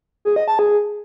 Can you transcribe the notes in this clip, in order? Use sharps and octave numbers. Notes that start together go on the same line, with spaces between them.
G#4
D#5
A5
G#4